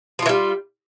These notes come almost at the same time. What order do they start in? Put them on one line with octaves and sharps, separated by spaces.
F3 F4 E3 G3